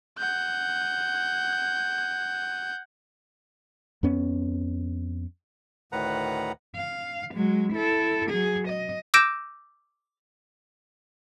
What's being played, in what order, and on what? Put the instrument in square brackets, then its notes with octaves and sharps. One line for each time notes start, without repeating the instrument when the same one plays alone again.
[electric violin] F#5 G6
[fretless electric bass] F2 B3 C#4
[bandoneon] D2 A2 D#3 B4 F#5 A#5
[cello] F5
F#3 G#3
E4 A4
F#3 G#4
D#5
[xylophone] D6 E6 G6 A#6 D7 E7